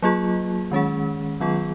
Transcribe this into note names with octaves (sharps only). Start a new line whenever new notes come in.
F#3 A#3 F4 G#4
D#3 G#3 C#4 G#4
D#3 F#3 B3 F4 G#4